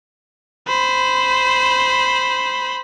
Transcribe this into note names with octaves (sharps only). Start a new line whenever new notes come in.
C5 B5